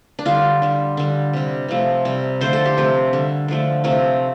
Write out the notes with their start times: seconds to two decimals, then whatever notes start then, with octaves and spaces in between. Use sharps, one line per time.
0.19 D4
0.26 D3 G3 F4
0.62 D3 G3
0.97 D3 G3
1.33 C3 G3
1.68 C3 F3 A3
2.05 C3 G3
2.41 D3 F3 A3 C5
2.53 A4
2.65 G4
2.78 C3 F3 A3
3.13 D3 G3
3.48 D3 F3 A3
3.84 C3 F3 A3